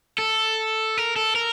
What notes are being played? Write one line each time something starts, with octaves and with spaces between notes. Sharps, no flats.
A4
A#4
A4
A#4